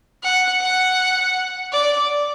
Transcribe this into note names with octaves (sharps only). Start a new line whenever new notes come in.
F#5
F#5
D5